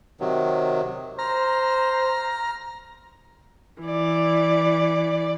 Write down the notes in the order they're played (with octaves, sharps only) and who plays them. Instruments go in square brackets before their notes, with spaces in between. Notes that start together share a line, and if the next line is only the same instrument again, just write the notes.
[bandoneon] C3 D#3 F#3
[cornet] C5 [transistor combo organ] A#5 [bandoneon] F6
[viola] E3 D5